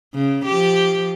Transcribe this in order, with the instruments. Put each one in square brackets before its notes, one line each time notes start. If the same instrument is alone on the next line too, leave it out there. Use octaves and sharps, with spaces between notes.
[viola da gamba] C#3
F3 G4